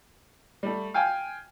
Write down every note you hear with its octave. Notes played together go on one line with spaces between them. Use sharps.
G3 A3
F5 G5 G#5